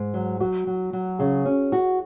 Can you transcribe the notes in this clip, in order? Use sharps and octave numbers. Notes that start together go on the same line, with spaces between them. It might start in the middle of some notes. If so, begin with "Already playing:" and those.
Already playing: G#2
F#3
F#3 F#4
F#3
F#3
C#3 G#4
C#4
F#4